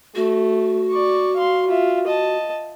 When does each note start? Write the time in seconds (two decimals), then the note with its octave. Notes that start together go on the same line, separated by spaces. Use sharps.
0.15 A3 F#4
0.91 D5 C#6
1.36 F5 C6
1.68 F4 E5
2.07 D#5 A5